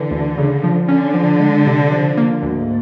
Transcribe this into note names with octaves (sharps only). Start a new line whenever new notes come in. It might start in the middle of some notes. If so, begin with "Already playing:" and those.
Already playing: D3 E3
D2
C#3
F3
D3 C#4
F3
G#3
C3
F3
A#3
D2 G#2